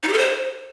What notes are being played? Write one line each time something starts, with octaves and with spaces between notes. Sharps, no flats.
D#4
G4
A4
C5